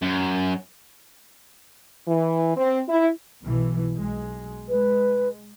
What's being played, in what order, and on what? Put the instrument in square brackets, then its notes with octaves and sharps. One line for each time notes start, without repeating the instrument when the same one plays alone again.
[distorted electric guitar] F#2
[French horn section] E3
C4
E4
[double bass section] B1 B2 E3
B1 G#3
[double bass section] G#3 [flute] B4